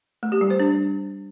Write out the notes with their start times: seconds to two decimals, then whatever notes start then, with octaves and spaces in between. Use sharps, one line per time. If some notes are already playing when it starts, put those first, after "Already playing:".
0.23 A3
0.32 G4
0.41 G3
0.50 C5
0.60 D4